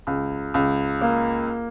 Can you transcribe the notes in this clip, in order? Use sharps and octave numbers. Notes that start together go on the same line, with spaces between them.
C#2
C#2
A#3